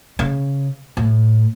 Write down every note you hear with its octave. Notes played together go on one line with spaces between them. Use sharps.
C#3
A2